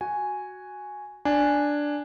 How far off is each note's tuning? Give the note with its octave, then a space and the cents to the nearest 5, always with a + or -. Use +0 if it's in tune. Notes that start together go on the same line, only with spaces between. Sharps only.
F#4 +0 G#5 +0
D4 +0 G#5 +0